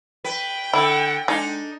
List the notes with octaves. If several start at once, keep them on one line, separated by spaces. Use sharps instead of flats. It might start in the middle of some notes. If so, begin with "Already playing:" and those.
B4 G5
D3 E4
G#3 D4 D#4